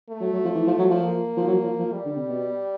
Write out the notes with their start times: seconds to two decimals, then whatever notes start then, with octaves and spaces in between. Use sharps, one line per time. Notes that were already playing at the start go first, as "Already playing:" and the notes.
0.10 A3
0.21 F#3
0.32 F#3
0.44 F3
0.55 E3
0.67 F3
0.78 F#3
0.90 F3
1.02 A#3
1.37 F3
1.47 F#3
1.63 F3
1.79 F3
1.93 G3
2.05 D3
2.16 C3
2.29 B2